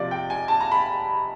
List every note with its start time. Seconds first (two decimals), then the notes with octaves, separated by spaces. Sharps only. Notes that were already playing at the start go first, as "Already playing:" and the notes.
Already playing: C3 F3 A#3 D5
0.11 G5
0.30 G#5
0.48 A5
0.61 A#5
0.72 B5